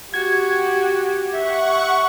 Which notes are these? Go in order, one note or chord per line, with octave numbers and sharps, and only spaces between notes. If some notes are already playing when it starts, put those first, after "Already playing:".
F#4 G4 G#6
E5 F#5 C#6